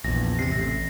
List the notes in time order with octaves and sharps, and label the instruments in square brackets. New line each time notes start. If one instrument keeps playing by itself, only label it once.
[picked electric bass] A#1 E2 [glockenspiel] A#6
[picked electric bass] C3 [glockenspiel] A#6 C7
[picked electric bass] A1